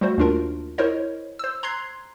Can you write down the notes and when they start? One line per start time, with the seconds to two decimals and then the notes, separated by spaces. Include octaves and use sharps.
0.01 G3 A3 F#4 C5
0.18 D#2 A3 D4 F4 A#4
0.78 E4 A#4 C5 C#5 D#5
1.39 C5 E6
1.63 A#5 C6 F#6 G#6 C7